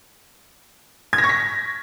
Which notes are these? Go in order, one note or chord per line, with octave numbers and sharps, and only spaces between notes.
G#6
A#6
C#6
B6